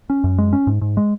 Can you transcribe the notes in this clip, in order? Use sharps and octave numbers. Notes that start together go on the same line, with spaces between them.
C#4
F#2
G#3
C#4
G#2
G#2
G#3